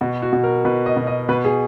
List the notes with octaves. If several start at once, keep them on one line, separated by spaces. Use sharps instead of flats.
B2 F#4
F#4
B2
A#4
B2 B4
D#5
B2
D#5
B2 B4
G#4